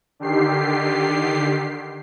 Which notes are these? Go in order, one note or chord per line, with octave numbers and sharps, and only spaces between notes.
D3 D#3 G4 C7